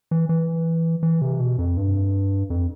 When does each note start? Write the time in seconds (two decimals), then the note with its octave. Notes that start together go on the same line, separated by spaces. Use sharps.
0.11 E3
0.29 E3
1.03 E3
1.21 C3
1.40 B2
1.58 F2
1.77 G2
2.50 F2